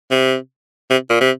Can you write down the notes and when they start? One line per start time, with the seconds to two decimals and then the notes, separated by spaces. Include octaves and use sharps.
0.11 C3
0.91 C3
1.10 A#2
1.21 C3